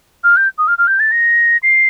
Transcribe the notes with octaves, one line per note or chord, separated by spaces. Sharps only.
F6
G6
D#6
F6
F6
G6
A6
A#6
C7